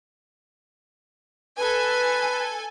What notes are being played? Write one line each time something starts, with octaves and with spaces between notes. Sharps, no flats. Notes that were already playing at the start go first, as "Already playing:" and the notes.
A4 B4 G#5